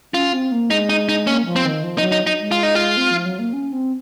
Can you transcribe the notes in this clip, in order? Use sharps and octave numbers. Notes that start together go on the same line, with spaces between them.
C#4 F4
C4
A#3
G#3 D#4
D#4
D#4
A#3 C#4
F3
C4
D#3
F3
D#4
F#3
D#4
D#4
G#3
F4
D#4
F4
C4
F3
F#3
A#3
C#4
C4